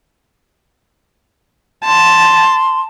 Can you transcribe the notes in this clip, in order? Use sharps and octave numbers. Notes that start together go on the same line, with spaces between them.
A5 C6